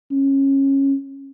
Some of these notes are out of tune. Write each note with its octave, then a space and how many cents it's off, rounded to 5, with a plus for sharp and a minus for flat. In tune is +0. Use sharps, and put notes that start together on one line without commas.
C#4 -20